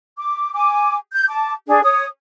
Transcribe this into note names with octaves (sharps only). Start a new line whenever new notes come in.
D6
G#5 D6
G6
A5 D6
D4 G#4
C#5 D#6